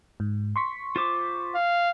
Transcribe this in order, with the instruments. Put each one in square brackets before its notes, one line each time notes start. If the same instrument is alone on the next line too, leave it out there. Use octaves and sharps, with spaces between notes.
[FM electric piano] G#2
C6 C#6 B6
[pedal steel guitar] F4 C5 D6
[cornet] F5